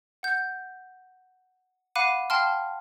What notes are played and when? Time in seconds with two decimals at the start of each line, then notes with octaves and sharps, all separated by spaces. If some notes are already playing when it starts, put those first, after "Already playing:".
0.23 F#5 G6
1.95 F5 F#5 B5 D6 F#6 D#7
2.30 F5 G5 A5 C6 F6